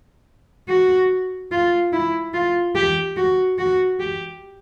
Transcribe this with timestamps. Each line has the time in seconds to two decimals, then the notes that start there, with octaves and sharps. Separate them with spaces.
0.69 F#4
1.51 F4
1.93 E4
2.34 F4
2.75 G4
3.17 F#4
3.59 F#4
4.00 G4